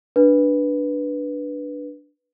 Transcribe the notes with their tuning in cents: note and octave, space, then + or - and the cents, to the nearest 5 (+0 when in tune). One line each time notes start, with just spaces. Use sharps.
D4 +0 B4 -5